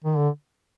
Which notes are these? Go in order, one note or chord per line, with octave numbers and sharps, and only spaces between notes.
D#3
D3